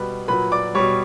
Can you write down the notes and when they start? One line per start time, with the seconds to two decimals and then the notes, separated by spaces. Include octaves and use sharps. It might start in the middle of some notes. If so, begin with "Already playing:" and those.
Already playing: B2 G3 B4 B5
0.28 A#2 F#3 B4 B5
0.52 D5 D6
0.75 B2 G3 C#5 C#6